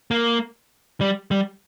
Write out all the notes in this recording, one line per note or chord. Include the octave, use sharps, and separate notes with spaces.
A#3
G3
G3